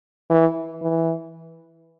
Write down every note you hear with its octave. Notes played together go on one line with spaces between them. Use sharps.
E3
E3